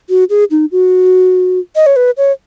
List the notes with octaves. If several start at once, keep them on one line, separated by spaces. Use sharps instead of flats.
F#4
G#4
D#4
F#4
D#5
C#5
B4
C#5